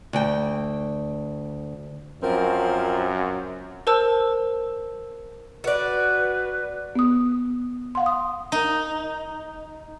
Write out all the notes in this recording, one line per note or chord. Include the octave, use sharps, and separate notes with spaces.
D2 G5
F#2 F3 C4 A#4
A#4 C5 A5 E6
F#4 B4 D5
B3 D#6
F5 F#5 C6
D#6
D#4